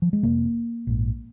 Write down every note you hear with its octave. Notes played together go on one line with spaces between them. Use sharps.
F3
G#3
F1 F2 C3 A#3
A#1 G#2